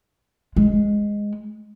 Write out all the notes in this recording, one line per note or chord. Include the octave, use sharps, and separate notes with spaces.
G#3